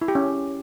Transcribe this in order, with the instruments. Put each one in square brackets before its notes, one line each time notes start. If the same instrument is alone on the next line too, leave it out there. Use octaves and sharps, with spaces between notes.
[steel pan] E4
G4
C#4